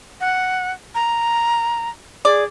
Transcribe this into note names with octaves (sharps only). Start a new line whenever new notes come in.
F#5
A#5
G#4 D5